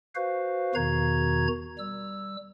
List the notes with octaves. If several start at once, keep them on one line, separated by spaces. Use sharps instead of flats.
F#4 B4 C5 F5
E2 B2 D#3 F#4 A#5 G#6
G3 E6